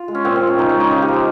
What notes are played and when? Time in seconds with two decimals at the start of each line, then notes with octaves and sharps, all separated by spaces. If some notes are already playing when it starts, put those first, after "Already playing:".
Already playing: F4
0.08 G#3
0.15 C#4
0.25 A#2 C4
0.36 C4
0.41 F3
0.47 C#4
0.58 C#3 D#4
0.69 G#3 C#4
0.80 D#4
0.91 C#3 D#4
1.02 G4
1.08 F3
1.14 C5